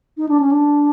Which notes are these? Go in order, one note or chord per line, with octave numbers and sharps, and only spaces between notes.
D#4
D4
C#4
D4